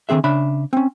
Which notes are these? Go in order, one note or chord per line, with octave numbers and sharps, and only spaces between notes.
D3 D#3 C4 G#4 E5
C#3 D4 E5 B5
C4 C#4